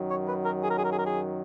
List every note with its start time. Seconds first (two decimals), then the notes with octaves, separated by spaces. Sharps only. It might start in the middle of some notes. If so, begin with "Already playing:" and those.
Already playing: F#2 D#3 F#3
0.10 C#5
0.28 B4
0.46 A#4
0.63 G#4
0.70 A#4
0.78 G#4
0.85 A#4
0.92 G#4
0.99 A#4
1.06 G#4